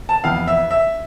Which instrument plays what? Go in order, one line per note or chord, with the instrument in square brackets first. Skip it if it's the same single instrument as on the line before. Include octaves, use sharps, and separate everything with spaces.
[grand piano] A5
F2 E3 B3 F5
E5
E5